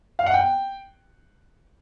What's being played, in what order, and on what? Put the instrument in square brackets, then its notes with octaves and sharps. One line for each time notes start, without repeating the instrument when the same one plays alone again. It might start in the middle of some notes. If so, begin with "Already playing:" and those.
[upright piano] F5
F#5
G5